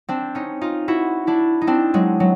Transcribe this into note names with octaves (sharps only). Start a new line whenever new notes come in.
C4 D4
C#4 D#4
D#4 F4
E4 F#4
D4 E4
D#4
C4 D4
F#3 G#3
F#3